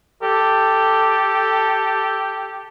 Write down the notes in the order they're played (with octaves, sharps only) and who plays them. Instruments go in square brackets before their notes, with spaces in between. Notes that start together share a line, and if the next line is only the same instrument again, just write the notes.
[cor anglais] G4 [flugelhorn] A4